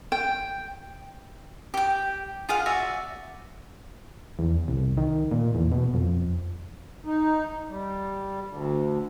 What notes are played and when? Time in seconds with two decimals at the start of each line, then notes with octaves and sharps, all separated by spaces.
0.12 G5
1.74 G4 G5
2.49 F4 G#4 F5 F#5
2.66 F#4 D5 E5
4.39 E2
4.68 C2
4.97 D#3
5.31 A#2
5.55 E2
5.72 B2
5.94 F2
7.05 D#4
7.69 G3
8.47 D2